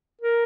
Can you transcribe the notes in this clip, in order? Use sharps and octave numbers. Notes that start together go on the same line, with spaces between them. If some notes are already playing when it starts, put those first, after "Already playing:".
A#4